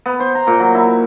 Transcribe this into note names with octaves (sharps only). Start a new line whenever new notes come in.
B3
C5
A#5
A#2
F#3
E4